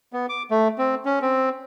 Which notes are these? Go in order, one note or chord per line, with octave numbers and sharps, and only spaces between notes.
B3
D6
A3
C4
C#4
C4